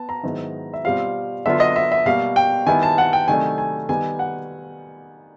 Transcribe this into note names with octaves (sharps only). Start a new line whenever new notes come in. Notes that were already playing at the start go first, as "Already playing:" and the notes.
Already playing: B3 A5
A#5
G#2 D#3 F#3 B3 E4
E5
B2 G3 C4 F4 F5
D3 F#3 B3 D4 F4 E5
D#5
E5
E5
B2 G3 A#3 F5
G5
D#3 G3 B3 E4 G#5
A5
F#5
G5
C3 D#3 F#3 A3 D4 G#5
G#5
D#3 G3 B3 D#4 G#5
F#5